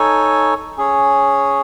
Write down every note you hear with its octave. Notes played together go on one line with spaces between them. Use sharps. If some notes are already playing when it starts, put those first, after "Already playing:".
Already playing: D#4 A4 C#5 G#5
C#4 G#4 C#5